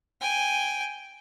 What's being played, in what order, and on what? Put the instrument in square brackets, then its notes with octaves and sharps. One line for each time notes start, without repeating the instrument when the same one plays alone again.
[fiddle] G5 G#5